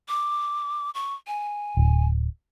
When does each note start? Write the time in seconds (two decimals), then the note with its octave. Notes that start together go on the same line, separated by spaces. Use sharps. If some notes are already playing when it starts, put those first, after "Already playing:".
0.09 D6
0.95 C#6
1.27 G#5
1.77 D1